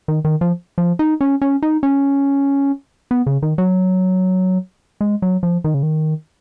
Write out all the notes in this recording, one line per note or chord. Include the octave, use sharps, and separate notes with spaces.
D#3
D#3
F3
F3
D#4
C#4
C#4
D#4
C#4
B3
C#3
D#3
F#3
G#3
F#3
F3
D#3
C#3
D#3